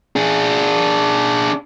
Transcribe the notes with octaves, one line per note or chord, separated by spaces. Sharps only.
D4 G#4